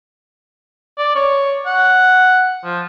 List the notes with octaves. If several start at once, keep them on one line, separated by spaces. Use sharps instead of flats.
D5
C#5
F#5
F3